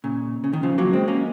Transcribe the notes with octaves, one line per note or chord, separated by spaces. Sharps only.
A#2 C#3
C#3
D#3
C#3 F3
F#3 A#3
G#3 C4
A#3 C#4